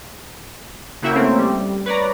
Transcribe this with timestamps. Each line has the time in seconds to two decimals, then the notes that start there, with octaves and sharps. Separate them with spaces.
1.02 C#3 A#3 E4 F#4 E5 G5
1.15 A3 A#3 C4 C#4
1.38 G3
1.86 B4 C#5 D5 A#5